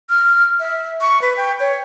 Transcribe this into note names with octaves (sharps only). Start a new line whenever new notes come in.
F6
E5
C#6
B4
G5
C#5